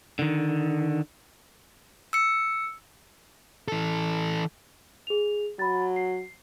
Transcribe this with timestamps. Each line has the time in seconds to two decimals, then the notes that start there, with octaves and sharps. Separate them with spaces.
0.19 D3 D#3
2.13 E6 C#7
3.68 E3 A4
5.07 G#4 F7
5.59 F#3 B5 A6
5.96 C7